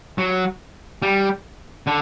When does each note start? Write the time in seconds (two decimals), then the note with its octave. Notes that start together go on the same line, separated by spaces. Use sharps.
0.18 F#3
1.02 G3
1.87 D3